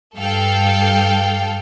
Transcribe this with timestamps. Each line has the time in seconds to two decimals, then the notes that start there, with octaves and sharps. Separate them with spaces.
0.16 G2 A4 F5 G5